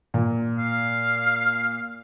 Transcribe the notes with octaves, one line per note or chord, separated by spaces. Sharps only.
A#2
F5